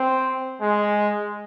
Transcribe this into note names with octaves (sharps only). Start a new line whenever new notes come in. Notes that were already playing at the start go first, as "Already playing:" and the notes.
Already playing: C4
G#3